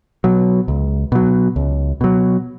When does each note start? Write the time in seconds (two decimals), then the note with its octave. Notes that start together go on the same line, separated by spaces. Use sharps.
0.24 B2 F#3
0.68 C#2
1.12 B2 F#3
1.56 C#2
2.01 B2 F#3